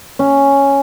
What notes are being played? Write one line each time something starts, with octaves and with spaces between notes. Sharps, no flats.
C#4